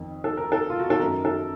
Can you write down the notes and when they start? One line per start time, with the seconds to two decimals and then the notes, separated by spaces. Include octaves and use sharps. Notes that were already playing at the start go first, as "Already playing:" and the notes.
Already playing: F2 D#3
0.24 A4
0.37 A#4
0.52 A4
0.70 F4
0.79 F#4
0.90 A4
0.99 F#2 D#3 A#4
1.25 A4